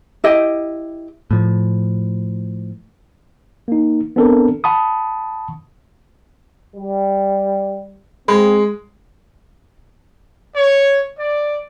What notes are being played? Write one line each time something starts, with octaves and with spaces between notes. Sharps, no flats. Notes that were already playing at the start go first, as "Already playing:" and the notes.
E4 G4 D#5 G5
A2 F3
A#3 D#4
B3 C4 D4 A4 A#4
F#5 A5 B5 C#6 D#6
G3
G#3 C4
C#5
D5